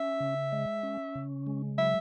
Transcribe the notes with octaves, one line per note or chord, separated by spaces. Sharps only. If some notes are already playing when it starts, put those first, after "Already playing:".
Already playing: C#4 E5
C#3
G#3
C#4
C#3
G#3
F#3 E5